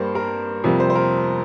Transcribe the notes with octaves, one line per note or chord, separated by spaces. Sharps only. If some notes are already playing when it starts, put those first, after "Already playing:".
Already playing: G2 G3 A#3 C5
A#4
F2 C3 G3 A#3
C5
C5
A#4